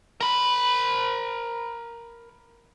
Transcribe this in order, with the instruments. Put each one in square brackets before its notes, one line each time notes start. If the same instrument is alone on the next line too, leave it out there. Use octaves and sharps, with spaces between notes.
[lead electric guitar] A#4 B5